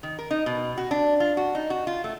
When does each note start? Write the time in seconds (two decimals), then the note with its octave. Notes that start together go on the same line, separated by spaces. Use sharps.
0.03 D#3
0.19 A#4
0.31 D#4
0.46 B2
0.78 F#4
0.91 D4
1.20 F4
1.37 F#4
1.55 D#4
1.70 F#4
1.87 F4
2.04 A3